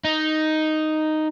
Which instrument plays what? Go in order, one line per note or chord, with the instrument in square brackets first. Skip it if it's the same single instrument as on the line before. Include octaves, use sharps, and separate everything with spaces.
[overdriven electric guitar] D#4